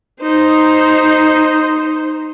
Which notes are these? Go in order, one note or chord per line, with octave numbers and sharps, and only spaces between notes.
D#4 C5